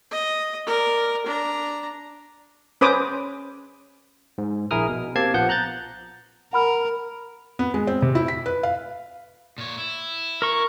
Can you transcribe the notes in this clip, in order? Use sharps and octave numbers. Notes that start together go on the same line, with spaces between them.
D#5
A#4 D5
D4 A#5
C#4 B4 C5 D6 D#6
G#2
A#1 E4 G#4 A#4 D#6 F6
B2
A#3 C4 G4 A5 G#6 C7
A#1 F3 B3 F#5 G6
A#5 F#6 G6 A6
A#4 F#5 B5 F6
B3
G#3
C4
C3
E4
B6
B4
F5
A#2 C#5
E4
A#4 C#6